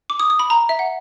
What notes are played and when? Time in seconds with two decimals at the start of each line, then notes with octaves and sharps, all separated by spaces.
0.10 D6
0.20 D#6
0.30 D#6
0.39 B5
0.50 A#5
0.69 E5
0.79 F#5